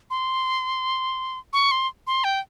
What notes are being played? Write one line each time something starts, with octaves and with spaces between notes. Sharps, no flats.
C6
C#6
C6
C6
G5